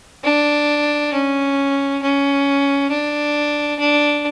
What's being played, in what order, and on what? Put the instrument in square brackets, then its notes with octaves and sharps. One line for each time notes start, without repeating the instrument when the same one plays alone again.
[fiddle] D4
C#4
C#4
D4
D4